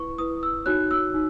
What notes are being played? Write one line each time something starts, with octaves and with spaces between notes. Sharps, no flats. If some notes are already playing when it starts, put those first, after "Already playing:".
Already playing: E4 B4 C#6
E4 B4 D#6
E6
D#4 F#4 C#5 F#6
E6
D#4